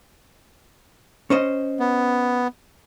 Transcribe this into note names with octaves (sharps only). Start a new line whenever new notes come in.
C#4 C5 D#5
B3